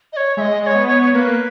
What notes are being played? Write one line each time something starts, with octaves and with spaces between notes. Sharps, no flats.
D#5
C#5
G#3 D#5 E5
D#5
C#5
B3
C#5
C#5
A#3 B4